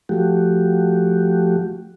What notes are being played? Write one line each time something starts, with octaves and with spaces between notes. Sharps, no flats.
F3 A3 F#4 G4